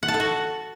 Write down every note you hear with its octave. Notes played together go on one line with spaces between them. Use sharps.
F#5
A5
A4
F#4